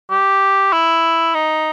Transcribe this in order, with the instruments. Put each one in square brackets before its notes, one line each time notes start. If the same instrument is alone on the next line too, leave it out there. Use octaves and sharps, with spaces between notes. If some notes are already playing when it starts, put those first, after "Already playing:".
[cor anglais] G4
E4
D#4